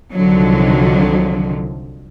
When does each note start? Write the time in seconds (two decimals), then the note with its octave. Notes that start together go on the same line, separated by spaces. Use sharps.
0.12 C2 D3 D#3 F3 F#3